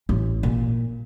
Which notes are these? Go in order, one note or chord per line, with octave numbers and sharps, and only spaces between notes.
A1
A#2